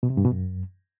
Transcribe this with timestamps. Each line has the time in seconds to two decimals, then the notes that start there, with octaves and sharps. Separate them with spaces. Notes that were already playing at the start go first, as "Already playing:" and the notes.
0.03 B2
0.10 C3
0.17 G2
0.24 B2
0.32 F#2